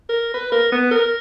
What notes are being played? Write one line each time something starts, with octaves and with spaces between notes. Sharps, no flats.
A#4
B4
A#4
B3
A#4